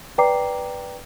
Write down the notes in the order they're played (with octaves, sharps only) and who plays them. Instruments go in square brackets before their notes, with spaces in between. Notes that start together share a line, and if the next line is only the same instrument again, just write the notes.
[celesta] B4 D5 G5 A#5 D6 C7